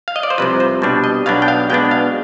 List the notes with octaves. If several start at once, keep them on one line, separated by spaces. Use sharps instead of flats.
F5
D#5
D5
C5
C2 C3 F3 B4
C5
B2 G3 D4
D#5
B1 B2 B3 D4 F5
G5
F5
B2 G#3 B3 D4 G5
F5